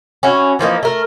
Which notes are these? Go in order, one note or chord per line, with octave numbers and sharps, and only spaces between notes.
C#4 E4 F#4
E3 F3 A#3 D#4
A3 A#4